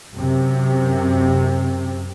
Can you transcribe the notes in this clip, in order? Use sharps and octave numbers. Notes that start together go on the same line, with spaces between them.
F#2 C3